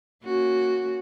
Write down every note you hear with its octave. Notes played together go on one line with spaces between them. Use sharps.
A#3 C#4 F#4